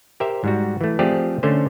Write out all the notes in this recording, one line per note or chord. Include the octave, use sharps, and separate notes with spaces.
G4 A#4 C5 E5
G#2 G3 F#4
E3 A3
F3 A3 C4 G4 G#4 D5
D3 A3 C#4 C5